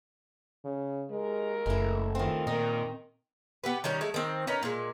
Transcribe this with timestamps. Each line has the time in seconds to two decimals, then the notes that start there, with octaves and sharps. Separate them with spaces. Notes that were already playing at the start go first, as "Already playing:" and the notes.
0.65 C#3
1.11 D#2 G#3 A#4
1.66 F#1 G#3 A3 E4
2.15 B2 D#3 E3 C4 F4
2.47 A#2 D#3 D#4 A#4 D#5
3.64 B3 G4 B4
3.84 D#3 F#3 G3 C#4
4.01 G#3 A3
4.14 D#3 C4
4.47 C#4 D#4 A#4 B4
4.63 A#2 G#3